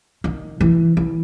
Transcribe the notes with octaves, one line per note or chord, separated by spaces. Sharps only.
D#3
E3
E3